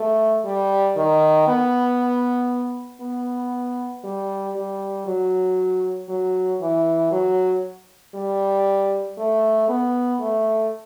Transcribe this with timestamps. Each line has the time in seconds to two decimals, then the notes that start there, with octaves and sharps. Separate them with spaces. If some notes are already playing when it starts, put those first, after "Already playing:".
Already playing: A3
0.45 G3
0.96 D#3
1.47 B3
3.01 B3
4.04 G3
4.56 G3
5.07 F#3
6.09 F#3
6.61 E3
7.11 F#3
8.15 G3
9.18 A3
9.69 B3
10.20 A3